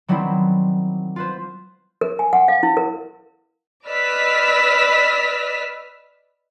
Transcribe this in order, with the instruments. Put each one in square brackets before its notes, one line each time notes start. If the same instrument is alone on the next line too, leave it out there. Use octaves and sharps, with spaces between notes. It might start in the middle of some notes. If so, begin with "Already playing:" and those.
[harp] D#3 F#3 G3 B3 C4 E4
F4 B4 C5
[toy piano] A#4
G#5
F#5
F5
E4
A#4
[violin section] B4 D5 D#5 E6 F6 B6